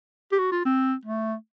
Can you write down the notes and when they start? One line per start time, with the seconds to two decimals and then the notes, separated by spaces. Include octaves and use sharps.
0.32 G4
0.39 F#4
0.52 F4
0.65 C4
1.06 A3